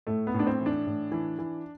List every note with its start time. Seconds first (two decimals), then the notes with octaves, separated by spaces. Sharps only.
0.07 A2 A3
0.27 B3
0.34 A2
0.39 D4
0.47 C4
0.60 E3
0.66 D4
0.86 A2
1.12 E3
1.39 E3